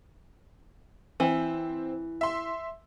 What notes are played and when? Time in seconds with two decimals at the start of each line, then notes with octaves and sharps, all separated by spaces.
1.20 E3 C4
2.21 E5 C6